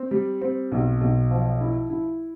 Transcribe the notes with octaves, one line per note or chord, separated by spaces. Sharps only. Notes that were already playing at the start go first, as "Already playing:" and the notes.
Already playing: C4
G3
C4
B1
B1
F3
E4
E4